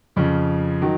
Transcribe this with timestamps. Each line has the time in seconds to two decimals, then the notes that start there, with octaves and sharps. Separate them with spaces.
0.16 F2 C#3 F3
0.82 D#3 F#3